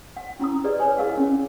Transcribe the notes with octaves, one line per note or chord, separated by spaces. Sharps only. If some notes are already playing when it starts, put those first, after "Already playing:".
F#5
C#4 E4 A#5 D#6
G4 G#4 B4 D5 D#5
B4 C#5 G#5
E4 G#4 A#4 D#5 F5 F#5
C#4